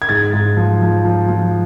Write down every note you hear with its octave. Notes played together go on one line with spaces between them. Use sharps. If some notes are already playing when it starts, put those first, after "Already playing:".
G#6
G#2 A6
G#2
F3
F3
F3
F3